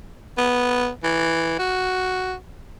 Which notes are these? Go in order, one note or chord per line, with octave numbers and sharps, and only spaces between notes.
B3
E3
F#4